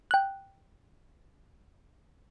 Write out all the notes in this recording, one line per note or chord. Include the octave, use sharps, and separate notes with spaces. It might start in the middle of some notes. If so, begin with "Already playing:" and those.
G5 F#6